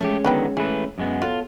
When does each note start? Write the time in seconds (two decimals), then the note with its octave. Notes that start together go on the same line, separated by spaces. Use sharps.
0.01 G#3 A3 C#4 G4
0.25 D3 D#3 F#3 B3 B4 G5
0.57 E3 A3 G#4 B4
0.98 F#2 G#3 B3
1.22 B3 F4 F#4 A4 C#5